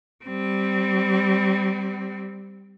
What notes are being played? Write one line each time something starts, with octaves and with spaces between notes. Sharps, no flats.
G3 C4